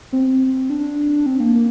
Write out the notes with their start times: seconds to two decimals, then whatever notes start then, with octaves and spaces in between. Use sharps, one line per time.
0.13 C4
0.70 D4
1.26 C4
1.40 A#3
1.55 A#3